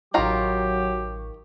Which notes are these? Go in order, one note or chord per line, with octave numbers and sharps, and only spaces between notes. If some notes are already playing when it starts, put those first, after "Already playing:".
A1 D#3 F#3 F4 G4 A#5 C#6